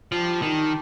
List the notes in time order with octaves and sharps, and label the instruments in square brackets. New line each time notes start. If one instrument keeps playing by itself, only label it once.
[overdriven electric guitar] F3 [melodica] G3 D4 G4
[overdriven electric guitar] D#3